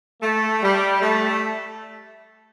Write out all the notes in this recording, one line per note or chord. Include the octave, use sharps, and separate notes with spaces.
A3
G3
A3